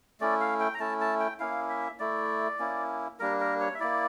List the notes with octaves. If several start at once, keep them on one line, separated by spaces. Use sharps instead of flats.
A3 C#4 E4 D5
F5
G5
A#5
A3 C#4 E4 A5
A5
G5
A#3 C#4 E4 F5
E5
A3 E4 D5
A#3 C#4 E4
G3 A#3 D4 A#4
A#4
C#5
E5
A#3 E4 D5